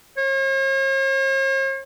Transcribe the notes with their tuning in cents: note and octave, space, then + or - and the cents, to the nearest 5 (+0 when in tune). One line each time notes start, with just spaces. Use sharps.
C#5 -45